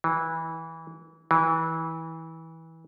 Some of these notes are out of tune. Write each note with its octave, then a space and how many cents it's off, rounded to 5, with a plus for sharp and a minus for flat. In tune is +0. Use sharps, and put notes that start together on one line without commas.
E3 -15
E3 -20